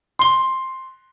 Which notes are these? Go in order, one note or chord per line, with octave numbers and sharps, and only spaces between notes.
C6 G7